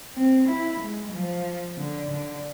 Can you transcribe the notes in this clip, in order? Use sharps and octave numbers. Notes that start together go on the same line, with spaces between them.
C4
E4
G#3
F3
D3
D3